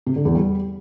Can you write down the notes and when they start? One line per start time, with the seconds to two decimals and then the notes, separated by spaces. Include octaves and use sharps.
0.07 C3
0.16 D3
0.25 E2
0.35 G3